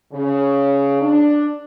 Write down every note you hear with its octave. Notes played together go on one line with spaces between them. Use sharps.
C#3
D4